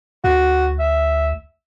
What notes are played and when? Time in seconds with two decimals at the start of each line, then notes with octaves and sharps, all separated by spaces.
0.24 D2 F#4
0.79 E5